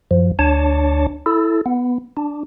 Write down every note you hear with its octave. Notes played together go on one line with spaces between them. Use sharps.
F#2 F3
D2 D4 C#5 A5
E4 A4
B3
D4